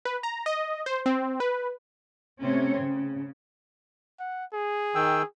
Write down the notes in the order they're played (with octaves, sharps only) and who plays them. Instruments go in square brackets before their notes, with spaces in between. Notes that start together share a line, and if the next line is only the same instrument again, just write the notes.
[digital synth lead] B4
A#5
D#5
C5
C4
B4
[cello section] C3 A3 C4 C#4 C#5
C#3
[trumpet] F#5
G#4
[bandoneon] D#3 G5 E6